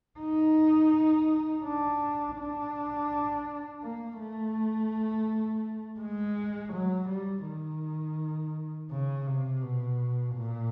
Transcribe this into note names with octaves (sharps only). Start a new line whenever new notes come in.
D#4
D4
D4
A#3
A3
G#3
F#3
G3
D#3
C#3
C3
B2
A#2